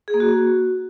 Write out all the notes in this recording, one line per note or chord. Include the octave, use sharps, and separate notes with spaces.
G#4
A#3
F#4